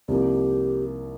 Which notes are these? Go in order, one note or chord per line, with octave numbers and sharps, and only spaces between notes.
C2 C3 F3 A#3 D#4 G4